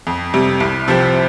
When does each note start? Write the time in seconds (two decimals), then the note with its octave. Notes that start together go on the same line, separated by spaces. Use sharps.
0.07 F2
0.34 C3 G3
0.60 C2
0.88 C3 F3 C4